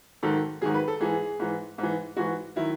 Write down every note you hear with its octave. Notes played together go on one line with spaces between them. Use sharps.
G#2 D#3 F#3 A4
G#2 D#3 F#3 G#4
B4
A4
G#2 E3 G#4
G#2 E3
G#2 E3
G#2 E3 F#4
D#3 F#3 E4